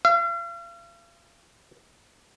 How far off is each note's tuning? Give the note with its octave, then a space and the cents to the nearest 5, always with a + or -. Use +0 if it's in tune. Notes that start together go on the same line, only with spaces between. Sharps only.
F5 -40